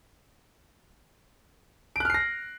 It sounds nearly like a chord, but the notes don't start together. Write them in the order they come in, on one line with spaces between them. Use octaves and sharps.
D7 F#6 F6 C7 A#6